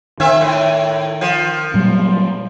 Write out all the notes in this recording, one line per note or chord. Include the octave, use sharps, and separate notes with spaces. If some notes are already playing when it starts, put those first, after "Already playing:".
D#3 C4 E5
A2
F3
A#2 F#3 G3